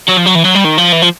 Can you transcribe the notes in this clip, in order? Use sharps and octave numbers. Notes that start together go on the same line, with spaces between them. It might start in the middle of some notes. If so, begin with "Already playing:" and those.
F#3
F3
F#3
E3
F#3
G3
D#3
F3
E3
F3